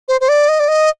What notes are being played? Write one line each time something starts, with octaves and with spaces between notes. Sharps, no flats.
C5
C5
D5
D#5
D5
D#5